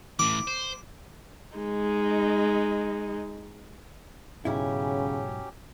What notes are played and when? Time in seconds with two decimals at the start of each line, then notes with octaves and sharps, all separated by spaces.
0.19 A2 E3 D6
0.47 C5
1.57 G#3 D#4
4.45 B1 G#2 C#3 F#3 C#4 E4 G4